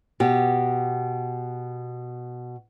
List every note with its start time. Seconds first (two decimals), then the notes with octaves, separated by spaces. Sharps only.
0.20 B2 G4